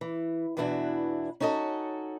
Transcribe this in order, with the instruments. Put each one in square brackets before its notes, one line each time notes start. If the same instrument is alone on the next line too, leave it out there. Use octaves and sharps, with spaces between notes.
[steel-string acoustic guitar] E3
E2 B2 E3 D4 E4 F#4
C#4 D#4 F#4 A4 D#5